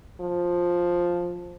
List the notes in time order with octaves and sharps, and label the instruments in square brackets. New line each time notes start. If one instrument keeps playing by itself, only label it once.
[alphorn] F3